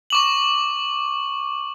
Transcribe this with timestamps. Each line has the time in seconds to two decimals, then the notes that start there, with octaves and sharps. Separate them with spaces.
0.10 C#6 D6 F#7